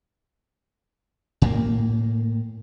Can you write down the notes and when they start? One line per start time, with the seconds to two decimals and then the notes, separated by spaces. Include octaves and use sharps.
1.42 A2 A#3